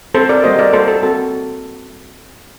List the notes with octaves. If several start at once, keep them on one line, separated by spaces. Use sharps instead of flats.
C4 F#4 A4 C5
A#4 D5
G3 A#3 F#4 C5 D#5
A#4 D5
A#3 F#4 A4 C5
A4
C4 F#4 A4